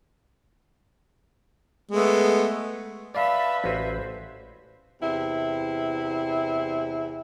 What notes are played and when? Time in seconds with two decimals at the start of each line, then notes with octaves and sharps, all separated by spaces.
1.91 G#3 A3 B3
3.15 B4 D5 E5 F5 A5 B5
3.64 A1 F#4 C5 G#5
5.01 E2 C3 E4